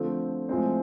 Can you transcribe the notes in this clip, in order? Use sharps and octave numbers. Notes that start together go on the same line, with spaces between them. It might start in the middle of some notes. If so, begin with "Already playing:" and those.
Already playing: D3 F3 A3 C4
A2 F3 G#3 C4 C5